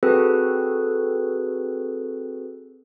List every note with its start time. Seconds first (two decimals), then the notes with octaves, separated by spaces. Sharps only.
0.03 C4 F#4 G#4 A4 B4